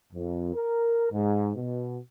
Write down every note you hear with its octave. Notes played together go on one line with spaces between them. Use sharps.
F2
A#4
G#2
B2